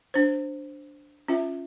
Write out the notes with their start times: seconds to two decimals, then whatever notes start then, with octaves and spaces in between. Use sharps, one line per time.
0.14 D4 C5
1.28 C#4 F4 E5